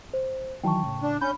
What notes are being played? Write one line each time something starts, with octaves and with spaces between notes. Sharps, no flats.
C5
D#3 E3 F#3 G5 A5 C#6
A2 C#3
D4
C#4 D4 B5 G6